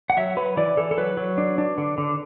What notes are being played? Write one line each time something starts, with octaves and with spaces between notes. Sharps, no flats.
F#5
F#3 E5
F#3 B4
E3 D5
E3 A4
A4
F#3 B4
F#3
D4
D4
D3
D3